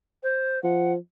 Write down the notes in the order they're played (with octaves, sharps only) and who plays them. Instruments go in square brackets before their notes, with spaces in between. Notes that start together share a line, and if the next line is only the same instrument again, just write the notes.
[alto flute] C5
[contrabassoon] F3 [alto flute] F#5